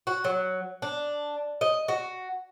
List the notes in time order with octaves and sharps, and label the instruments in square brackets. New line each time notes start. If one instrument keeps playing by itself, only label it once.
[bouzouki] F#4
F#3
D4
D#5
F#4